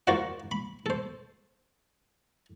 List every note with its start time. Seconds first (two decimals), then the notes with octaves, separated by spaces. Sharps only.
0.07 F4 F#4 A#4 C5 D5 F#5
0.51 B5
0.86 A4 C5